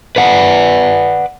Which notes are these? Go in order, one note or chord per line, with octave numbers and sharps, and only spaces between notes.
B4 D5 F#5